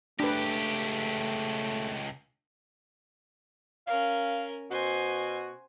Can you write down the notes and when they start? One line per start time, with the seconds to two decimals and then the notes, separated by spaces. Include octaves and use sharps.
0.20 C#2 A3 D4 G4 B4
3.87 C#4 A#4 F5
4.71 B2 F#4 C5 G#5